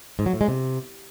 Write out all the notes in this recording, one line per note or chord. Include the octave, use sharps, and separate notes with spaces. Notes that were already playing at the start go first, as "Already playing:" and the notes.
G#2
F#3
A2
G#3
C3